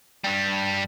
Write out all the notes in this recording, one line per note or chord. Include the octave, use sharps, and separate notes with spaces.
G2 G3